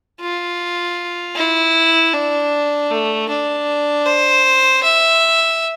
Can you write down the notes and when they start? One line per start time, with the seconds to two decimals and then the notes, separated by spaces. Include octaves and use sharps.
0.20 F4
1.36 E4
2.13 D4
2.91 A3
3.29 D4
4.06 C5
4.83 E5